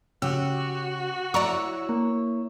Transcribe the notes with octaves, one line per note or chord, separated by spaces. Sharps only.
C#3 F#4 G4 E6
E4 C#5 D5 A#5 C#6 E6
A#3